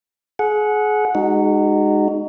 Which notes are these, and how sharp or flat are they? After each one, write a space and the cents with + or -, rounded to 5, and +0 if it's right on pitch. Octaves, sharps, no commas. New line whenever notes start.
G#4 +30 F#5 -10
G#3 +0 D#4 -20 F#4 +20